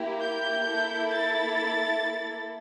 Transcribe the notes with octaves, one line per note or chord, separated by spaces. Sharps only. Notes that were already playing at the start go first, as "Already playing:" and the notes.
Already playing: A#3 E4 G4
G6
A#3 E4 A4
A6